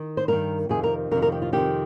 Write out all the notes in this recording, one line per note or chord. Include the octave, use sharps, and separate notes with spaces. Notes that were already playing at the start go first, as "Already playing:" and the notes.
Already playing: D#3
C5
G2 D#3 A#4
F2 C3 D#3 G#4
A#4
F2 C3 D#3 A#4
A#4
G4
F4
F2 C3 D#3 G4